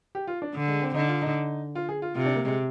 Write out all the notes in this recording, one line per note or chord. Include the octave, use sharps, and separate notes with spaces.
G4
F4
D4
D3
G#3
C4
D3 D#4
F4
D#4
F4
G#4
F4
C3 F4
D4
A#3
G#3